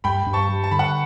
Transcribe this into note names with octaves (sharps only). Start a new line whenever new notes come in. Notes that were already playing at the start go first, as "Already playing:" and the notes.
G2 G5 B5
G2
A5 C#6
G3
A5
D3 B5
F#5 A5